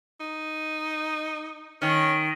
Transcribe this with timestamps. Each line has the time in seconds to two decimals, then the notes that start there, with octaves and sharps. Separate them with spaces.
0.20 D#4
1.82 D#3 C#4